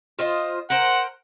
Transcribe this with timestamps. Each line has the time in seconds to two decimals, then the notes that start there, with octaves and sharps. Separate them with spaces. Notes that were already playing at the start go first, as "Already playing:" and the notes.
0.19 F4 C5 D#5
0.70 A#4 C5 F#5